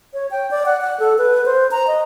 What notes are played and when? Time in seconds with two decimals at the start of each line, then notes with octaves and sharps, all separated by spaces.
0.14 C#5
0.31 G5
0.51 D5
0.66 F#5
0.81 F#5
1.00 A4
1.18 B4
1.45 C5
1.71 A#5
1.87 D#5